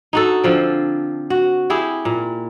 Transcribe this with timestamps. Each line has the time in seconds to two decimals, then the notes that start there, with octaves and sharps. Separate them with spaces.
0.13 D#4 F#4 A4
0.44 D3 F3 C4
1.30 F#4
1.70 E4 G4 G#4
2.05 A#2